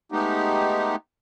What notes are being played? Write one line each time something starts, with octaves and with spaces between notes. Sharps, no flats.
G#3 A3 B3 D#4 G4